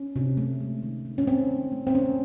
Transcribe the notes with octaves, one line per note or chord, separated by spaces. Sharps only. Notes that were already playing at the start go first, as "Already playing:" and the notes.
Already playing: C#4
C3
A3
G#3
D#3
D#3
C#4
D#3 C4
D#3
A3
C4
D#3 C#4